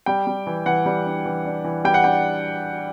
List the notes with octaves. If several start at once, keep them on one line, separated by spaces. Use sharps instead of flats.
G3 G5
G3
E3
E3 F#5
G3
D4
E3
D4
E3
G3 G5
F#5
D4 G5